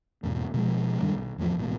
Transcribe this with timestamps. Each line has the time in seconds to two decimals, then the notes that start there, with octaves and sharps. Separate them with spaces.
0.23 E2 G#2 B2
0.54 B2 F3 G#3
1.01 G2 D#3 G3 D4
1.15 B1
1.38 E2 A2 D3 F3
1.57 A1 G#2 B2